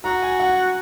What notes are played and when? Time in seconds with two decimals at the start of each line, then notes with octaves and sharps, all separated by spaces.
0.04 F#4 A#5
0.22 G#5
0.40 F#5